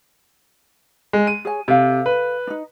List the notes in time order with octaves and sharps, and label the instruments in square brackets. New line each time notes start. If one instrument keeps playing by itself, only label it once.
[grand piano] G#3
D#7
[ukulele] G#4 C#5 G#5
[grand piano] C3 [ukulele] A4 F5
[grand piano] B4
[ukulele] D4 D#4